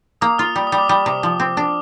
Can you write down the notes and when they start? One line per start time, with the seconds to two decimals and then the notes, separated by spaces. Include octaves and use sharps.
0.21 A#3 D#6
0.38 F4 F6
0.56 G3
0.67 D#6
0.72 G3
0.78 D6
0.89 G3 D#6
1.06 C3
1.23 F3
1.40 C4
1.57 D4